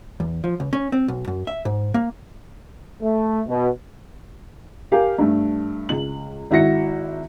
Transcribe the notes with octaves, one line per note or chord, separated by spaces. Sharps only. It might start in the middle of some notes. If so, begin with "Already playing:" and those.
E2
F3
C#2
C#4
C4
B1
F#2
E5
G#2
A#3
A3
B2
G4 A#4 F5 G#5
G2 A3
C#2 F#7
G#1 E4 F#4 A#6 C#7